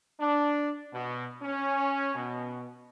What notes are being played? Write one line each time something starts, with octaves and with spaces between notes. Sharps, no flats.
D4
B2
C#4
B2